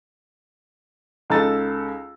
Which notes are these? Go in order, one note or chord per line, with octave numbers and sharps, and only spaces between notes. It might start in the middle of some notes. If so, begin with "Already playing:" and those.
C#2 D#4 A4 A#5 E6 A6